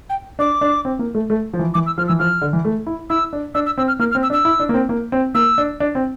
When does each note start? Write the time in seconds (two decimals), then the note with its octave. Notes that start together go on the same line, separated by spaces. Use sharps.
0.10 G5
0.39 D4 D6
0.61 D4
0.85 C4
0.99 A#3
1.15 A3
1.30 A3
1.53 F3
1.59 E3
1.74 E3 D6
1.86 E6
1.98 F3 F6
2.08 E3 E6
2.19 F3 F6
2.42 D3
2.53 E3
2.65 A3
2.87 E4
3.10 E4 E6
3.33 D4
3.55 D4 E6
3.66 E6
3.78 C4 E6
3.88 F6
3.99 A#3 F6
4.11 F6
4.15 C4
4.23 E6
4.30 D4
4.33 E6
4.45 E4
4.60 D4
4.69 A#3
4.74 C4
4.89 A#3
5.12 C4
5.35 A#3 E6
5.58 D4
5.80 D4
5.95 C4